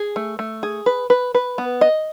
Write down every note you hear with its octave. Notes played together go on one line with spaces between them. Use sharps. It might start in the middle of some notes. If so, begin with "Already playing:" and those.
Already playing: G#4
A3
A3
G#4
B4
B4
B4
B3
D#5